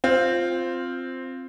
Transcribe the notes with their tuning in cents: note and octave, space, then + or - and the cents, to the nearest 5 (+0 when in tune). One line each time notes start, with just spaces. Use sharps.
C4 +0 F4 +0